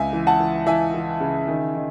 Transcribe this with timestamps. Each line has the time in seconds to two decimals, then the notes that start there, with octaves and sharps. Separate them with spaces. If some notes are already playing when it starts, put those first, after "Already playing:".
Already playing: C#2 E5 G#5
0.13 E3
0.27 F#5 A5
0.40 E3
0.66 E3 E5 G#5
0.94 E3
1.20 C#3
1.48 D#3
1.75 D#3